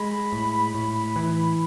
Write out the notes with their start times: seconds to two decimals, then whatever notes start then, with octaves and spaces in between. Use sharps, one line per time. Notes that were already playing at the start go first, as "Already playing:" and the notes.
Already playing: G#3 B5
0.32 A2
0.75 A2
1.16 E3